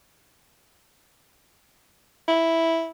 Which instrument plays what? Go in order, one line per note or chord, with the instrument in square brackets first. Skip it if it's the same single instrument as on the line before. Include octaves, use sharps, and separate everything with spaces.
[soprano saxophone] E4